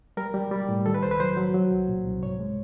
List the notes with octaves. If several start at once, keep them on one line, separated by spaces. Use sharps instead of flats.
G3 A#4
G3
G3
A2
D#3 A4
B4
C2 C5
B4
F#3 C5
F#3
F#3
C2
A#2
C2
G#2 C#5
G#3